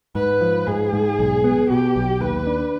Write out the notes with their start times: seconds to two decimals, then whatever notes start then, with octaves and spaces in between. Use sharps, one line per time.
0.15 G#2 B4
0.41 F3
0.67 G#2 G#4
0.93 G#2
1.19 B1
1.44 B3
1.70 B2 G4
1.96 B1
2.21 D#2 B4
2.47 D4